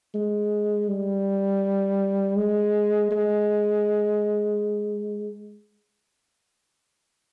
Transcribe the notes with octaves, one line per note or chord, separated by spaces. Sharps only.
G#3
G3
G#3
G#3